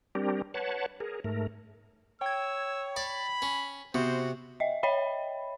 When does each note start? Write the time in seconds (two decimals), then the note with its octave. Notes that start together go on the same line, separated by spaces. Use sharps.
0.15 G3 C4 D4 G4 A#4
0.54 B4 C#5 F#5 A5
1.00 G#4 A#4
1.24 G#2 A3 A#4
2.21 C#5 G5 E6 G#6
2.96 D5 B5
3.42 C#4
3.94 C3 B3 F#4 C5
4.60 D#5 E5
4.83 C#5 D#5 E5 G5 B5